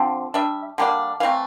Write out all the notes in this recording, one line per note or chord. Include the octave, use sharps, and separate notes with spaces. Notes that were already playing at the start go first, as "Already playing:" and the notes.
Already playing: D3 F3 C4
G3 D4 E5
D3 G3 A#3 D4
E3 A3 C4 F5